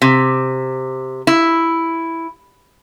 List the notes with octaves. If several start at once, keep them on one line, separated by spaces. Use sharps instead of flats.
C3
E4